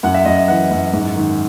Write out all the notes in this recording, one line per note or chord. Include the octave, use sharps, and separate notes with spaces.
F#2 F#5
E5
F#2 D#5
E5
E3 F#5
F#2
G#2
D#3